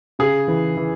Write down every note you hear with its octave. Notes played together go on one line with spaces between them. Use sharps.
C#3 G#4
E3
E3